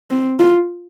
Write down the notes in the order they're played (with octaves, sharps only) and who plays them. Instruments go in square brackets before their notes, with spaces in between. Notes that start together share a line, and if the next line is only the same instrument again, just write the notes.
[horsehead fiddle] C4
F4